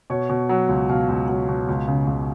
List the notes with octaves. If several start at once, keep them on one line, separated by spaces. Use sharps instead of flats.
B2 C#5
B2
F#3
C#2
B2 F5
C#2
F#3
B2
C#2
C#3
C#2